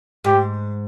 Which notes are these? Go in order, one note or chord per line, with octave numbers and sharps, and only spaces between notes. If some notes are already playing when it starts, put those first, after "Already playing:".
G#2 G4